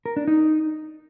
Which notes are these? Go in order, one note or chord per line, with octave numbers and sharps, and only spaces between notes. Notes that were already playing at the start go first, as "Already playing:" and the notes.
A#4
D4
D#4